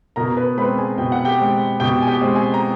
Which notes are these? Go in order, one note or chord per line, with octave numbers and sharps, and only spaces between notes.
B2 A#4 A#5
A#5
B4 B5
G#3 C4 B4 B5
G#4 G#5
B2 G5
F#5
G4 G5
G#3 C4
B2 G4 G5
G#5
G4 G5
G#3 C4
G#4 G#5
A#5